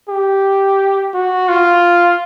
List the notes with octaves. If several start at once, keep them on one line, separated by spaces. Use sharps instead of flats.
G4
F#4
F4